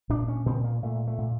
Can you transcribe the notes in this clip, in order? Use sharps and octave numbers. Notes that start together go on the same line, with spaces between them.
A#2 D4
C#4
A#2 C4
A#3
A#2 A3
A3
A#2